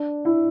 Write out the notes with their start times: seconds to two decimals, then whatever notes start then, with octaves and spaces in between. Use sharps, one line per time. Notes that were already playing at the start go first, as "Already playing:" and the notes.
Already playing: D4
0.25 E4